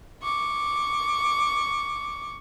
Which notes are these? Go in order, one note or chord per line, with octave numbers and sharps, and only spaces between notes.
C#6 D6